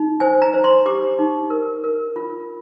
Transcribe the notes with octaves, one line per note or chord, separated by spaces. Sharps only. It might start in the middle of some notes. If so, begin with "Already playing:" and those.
Already playing: D#4
C5 G#5
A#5
C5
C6
G4 D6
D#4
A#4
A#4
F4